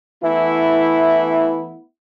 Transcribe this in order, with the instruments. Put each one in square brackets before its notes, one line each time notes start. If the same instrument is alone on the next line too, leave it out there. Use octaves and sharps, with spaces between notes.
[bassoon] E3 [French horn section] A3 B3 E4